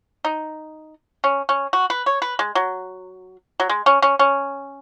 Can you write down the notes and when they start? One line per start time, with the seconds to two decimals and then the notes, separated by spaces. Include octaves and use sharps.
0.25 D#4
1.24 C#4
1.49 C#4
1.73 F#4
1.90 B4
2.06 C#5
2.22 B4
2.39 G#3
2.55 F#3
3.60 F#3
3.69 G#3
3.86 C#4
4.02 C#4
4.19 C#4